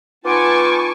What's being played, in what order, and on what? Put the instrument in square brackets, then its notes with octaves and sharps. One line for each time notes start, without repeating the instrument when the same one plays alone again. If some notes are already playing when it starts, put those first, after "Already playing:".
[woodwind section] B3 D#4 F4 [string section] G#5 A5 C#6 [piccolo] D6